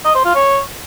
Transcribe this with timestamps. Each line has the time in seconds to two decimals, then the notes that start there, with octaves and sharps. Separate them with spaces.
0.05 D#5
0.15 C5
0.25 F4
0.35 C#5